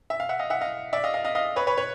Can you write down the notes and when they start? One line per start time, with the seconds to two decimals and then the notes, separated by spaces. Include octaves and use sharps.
0.10 E5
0.20 F5
0.29 E5 F#5
0.39 D#5 F5
0.50 E5 F#5
0.61 D#5 F5
0.93 D5 E5
1.04 D#5 F5
1.14 D#5 F5
1.25 D#5 F5
1.35 D#5 F5
1.56 B4 C#5
1.67 B4 C#5
1.78 B4 C#5